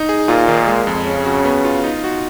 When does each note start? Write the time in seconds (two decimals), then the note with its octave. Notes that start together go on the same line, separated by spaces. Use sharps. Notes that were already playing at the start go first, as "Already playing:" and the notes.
Already playing: D#4
0.09 G#4
0.28 A#2 F4
0.48 D#3
0.67 G#3
0.87 F2
1.06 C#3 C#4
1.26 F#4
1.45 B3
1.65 F4
1.84 D#4
2.04 F#4